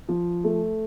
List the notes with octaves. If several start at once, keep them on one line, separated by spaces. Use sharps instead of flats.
F3
A3